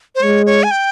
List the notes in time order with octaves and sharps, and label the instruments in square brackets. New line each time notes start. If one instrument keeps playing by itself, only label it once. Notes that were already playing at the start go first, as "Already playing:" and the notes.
[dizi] C5
[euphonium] G#3 [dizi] C#5
[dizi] C#5
G#5
G5